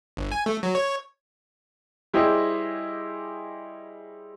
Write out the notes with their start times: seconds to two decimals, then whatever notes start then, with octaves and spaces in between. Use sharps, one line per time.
0.17 G1
0.32 G#5
0.46 A3
0.63 F#3
0.75 C#5
2.14 G3 E4 G4 G#4 C5 D#5